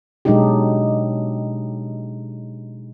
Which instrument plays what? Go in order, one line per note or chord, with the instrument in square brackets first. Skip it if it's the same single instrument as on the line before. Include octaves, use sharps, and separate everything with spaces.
[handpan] B2 F#3 G#3 D4 D#4 G4